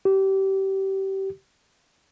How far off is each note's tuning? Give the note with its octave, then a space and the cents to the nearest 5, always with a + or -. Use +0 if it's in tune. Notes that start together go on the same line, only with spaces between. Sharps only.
G4 -25